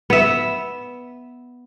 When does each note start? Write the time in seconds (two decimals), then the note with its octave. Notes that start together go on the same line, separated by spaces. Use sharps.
0.10 B3 E5